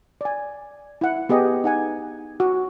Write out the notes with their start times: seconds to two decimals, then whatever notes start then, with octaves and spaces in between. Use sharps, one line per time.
0.21 D5 G#5
1.01 E4 F#5
1.29 B3 G4 G#4 D#5
1.64 D#4 F#5 G#5
2.40 F#4